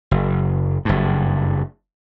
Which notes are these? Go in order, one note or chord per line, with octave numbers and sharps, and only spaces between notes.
F#1
F#1 G2